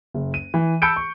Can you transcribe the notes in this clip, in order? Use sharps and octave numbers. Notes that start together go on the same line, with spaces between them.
F#1
D#7
E3
A5 B5 E6 G6 C#7 D7
C#6